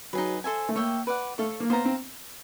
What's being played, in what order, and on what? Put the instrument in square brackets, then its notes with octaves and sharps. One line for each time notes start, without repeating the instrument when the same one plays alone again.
[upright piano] F#3 [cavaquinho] D#4 G#4 B4
[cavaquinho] A4 C5 E5 G#5
[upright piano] A3
[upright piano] A#3 [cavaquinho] C#5 E5 G5
[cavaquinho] B4 D5 F#5
[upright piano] A3 [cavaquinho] A4 C#5 F5
[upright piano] A#3
[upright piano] B3 [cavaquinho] C5 F5 A#5
[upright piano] C4